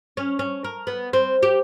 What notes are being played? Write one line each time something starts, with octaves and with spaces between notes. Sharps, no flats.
C#4
C#4
A#4
B3
C4
G4